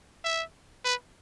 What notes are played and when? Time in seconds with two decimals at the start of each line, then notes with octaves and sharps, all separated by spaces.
0.24 E5
0.84 B4